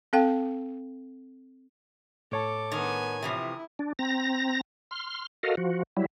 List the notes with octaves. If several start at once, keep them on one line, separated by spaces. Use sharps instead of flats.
C4 A4 F5 G5
A2 A4 C#5 A5 D6
D#3 B3 G#5
C3 E3 F3 E4 D#6
D4
C4 A#5 A#6
C6 F6
F#4 A4 A#4 D#5 F5
F3 F#4
F#3 G3 E4